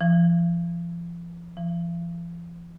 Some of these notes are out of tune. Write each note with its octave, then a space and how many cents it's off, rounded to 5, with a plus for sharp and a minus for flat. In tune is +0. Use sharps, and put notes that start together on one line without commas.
F3 -40
F3 -45